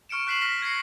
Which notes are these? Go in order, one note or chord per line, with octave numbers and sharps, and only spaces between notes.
C#6 F6 C#7 D7 E7
C#6 F#6 B6 C7 E7 F#7
F6 A#6 B6
G#6 A#6 C7 C#7